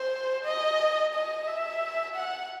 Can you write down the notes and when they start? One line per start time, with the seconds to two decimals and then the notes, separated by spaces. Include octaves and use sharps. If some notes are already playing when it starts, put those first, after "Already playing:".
Already playing: C5
0.45 D#5
1.14 D#5
1.47 E5
2.16 F#5